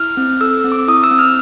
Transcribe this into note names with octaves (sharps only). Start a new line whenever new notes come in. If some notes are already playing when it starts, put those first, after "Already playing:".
Already playing: E4 F6
C4
A4 E6
E6
C4
D6
E4 D#6
E6
C4
F6